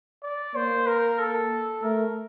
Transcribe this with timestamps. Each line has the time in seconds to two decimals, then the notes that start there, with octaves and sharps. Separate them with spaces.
0.23 D5
0.56 A#3 C5
0.87 A#4
1.19 A4
1.83 A3 A#4